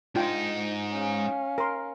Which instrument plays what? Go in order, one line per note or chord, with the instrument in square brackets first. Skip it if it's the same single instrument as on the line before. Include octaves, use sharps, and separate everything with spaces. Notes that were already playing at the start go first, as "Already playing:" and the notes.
[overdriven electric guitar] G#2 D#4 [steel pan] D4 F4 G5
[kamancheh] C#4 F5
[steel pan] A#4 C6